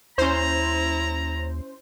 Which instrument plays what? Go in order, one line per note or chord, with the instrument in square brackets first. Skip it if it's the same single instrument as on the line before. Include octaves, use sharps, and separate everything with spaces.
[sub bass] D#2 [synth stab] C#4 C5 [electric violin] E4 [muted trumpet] A#5